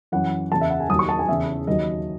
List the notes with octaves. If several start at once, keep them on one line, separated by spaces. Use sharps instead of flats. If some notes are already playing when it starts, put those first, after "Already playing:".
F#2 E3 F#5
E2 C#3 E3 A5
E5
F#5
G#5
D#2 D#3 F#3 D#6
C#6
A5
G#5
E2 C#3 E3 E5
D#2 D#3 F#3 D#5